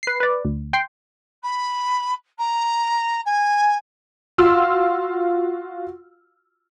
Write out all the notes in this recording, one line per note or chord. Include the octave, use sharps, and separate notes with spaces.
B4 C7
B4 D5
D2
G5 C6
B5
A#5
G#5
F4 F#4 F5 C6 E6 F6